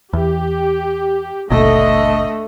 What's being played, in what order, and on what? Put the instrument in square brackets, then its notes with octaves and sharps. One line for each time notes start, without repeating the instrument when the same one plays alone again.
[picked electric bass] E2 [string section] G4
[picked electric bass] D#1 G#1 B2 [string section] D3 [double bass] A3 [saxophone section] D#5